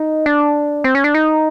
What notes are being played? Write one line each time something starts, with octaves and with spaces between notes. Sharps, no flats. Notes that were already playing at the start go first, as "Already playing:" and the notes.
Already playing: D#4
D4
C4
C#4
D4
D#4